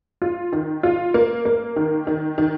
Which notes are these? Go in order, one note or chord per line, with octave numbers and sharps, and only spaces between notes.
F4
D#3
F4
A#3
A#3
D#3
D#3
D#3